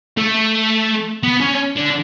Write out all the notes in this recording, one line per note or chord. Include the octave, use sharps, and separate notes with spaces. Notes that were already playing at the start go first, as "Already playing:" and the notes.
A3
B3
C#4
D3